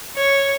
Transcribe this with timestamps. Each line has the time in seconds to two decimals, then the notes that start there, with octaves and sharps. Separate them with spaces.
0.17 C#5